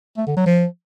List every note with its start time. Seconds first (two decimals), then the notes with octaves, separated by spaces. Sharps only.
0.17 A3
0.27 D3
0.37 F#3
0.46 F3